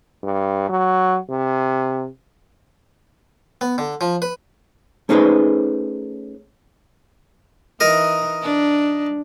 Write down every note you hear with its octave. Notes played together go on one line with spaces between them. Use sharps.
G2
F#3
C3
B3
D3
F3
B4
A3 C#4 D#4 G#4 B4 C5
E3 D#4 A#4 D#5
D4